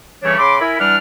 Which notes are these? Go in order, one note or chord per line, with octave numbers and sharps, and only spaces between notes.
C#3 E3 G3 A3 D4 C#5
C#3 B5 C6 D6
E4 A#4 E5 G#5 B5
E3 G3 D4 D5 F#5 F6